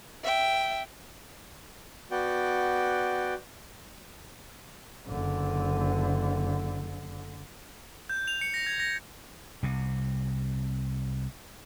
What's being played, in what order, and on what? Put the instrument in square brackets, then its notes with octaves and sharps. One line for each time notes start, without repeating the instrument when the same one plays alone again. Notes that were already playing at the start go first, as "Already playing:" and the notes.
[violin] E5 G5
[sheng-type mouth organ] B3 F#4 D5 G5
[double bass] F#1 D3
[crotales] G6
F7
C#7
A#6
G#6
A#6
[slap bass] C2 C3